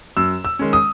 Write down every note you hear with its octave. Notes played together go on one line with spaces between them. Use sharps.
F#2 E6
E6
D#3 G#3 C#4
D#6